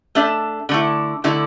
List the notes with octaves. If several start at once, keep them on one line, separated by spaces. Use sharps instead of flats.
A3 D4 A4 E5
D3 A3 E4
D3 A3 E4